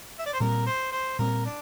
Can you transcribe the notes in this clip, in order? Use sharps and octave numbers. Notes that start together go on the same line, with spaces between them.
E5
D5
C5
A#2 G3 C4 A#4
C5
C5
A#2 G3 C4 A#4
D4